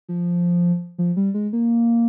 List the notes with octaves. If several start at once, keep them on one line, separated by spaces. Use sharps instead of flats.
F3
F3
G3
G#3
A#3